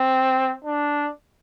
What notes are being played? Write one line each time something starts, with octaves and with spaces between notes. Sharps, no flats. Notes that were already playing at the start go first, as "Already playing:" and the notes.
Already playing: C4
D4